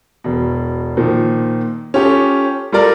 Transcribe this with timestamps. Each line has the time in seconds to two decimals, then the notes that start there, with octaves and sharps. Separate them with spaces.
0.24 E1 B2
0.97 A#2 D#3 F3
1.94 C#4 F4 G4 A4
2.72 G3 F4 A4 A#4 D5 F6